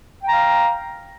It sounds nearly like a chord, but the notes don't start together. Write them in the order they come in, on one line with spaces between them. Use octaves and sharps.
G5 A#5 F5